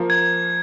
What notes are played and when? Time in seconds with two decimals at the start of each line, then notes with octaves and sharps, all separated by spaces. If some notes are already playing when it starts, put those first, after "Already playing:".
Already playing: F3 A#3
0.10 G#6